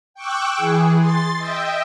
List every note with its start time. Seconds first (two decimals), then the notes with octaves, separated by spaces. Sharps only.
0.14 G5 C#6 D6 E6 F#6
0.56 E3 G#4
0.98 C6 A6
1.37 D#5 E5 G5